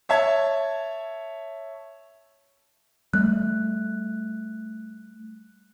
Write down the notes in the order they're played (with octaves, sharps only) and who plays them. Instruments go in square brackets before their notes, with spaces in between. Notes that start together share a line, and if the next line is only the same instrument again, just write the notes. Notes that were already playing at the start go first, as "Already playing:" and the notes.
[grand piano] C#5 E5 A5 G#6
[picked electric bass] G3 A3 [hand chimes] F#6